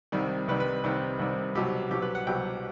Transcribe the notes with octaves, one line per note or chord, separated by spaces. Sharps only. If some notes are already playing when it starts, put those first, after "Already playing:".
C2 C3 D#3 G3
C2 C3 D#3 G3 B4
B4
C2 C3 D#3 G3
C2 C3 D#3 G3
C2 B2 F#3 G4
C2 B2 F#3 G4
B4
F#5
C2 B2 F#3 G5